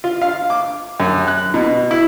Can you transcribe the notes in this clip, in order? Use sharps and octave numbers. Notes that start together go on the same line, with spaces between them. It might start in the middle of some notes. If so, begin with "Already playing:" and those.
F4
F5
D6
F#2
F#6
B2
E4